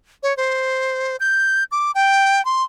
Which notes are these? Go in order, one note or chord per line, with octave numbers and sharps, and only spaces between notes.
C#5
C5
G6
D6
G5
C6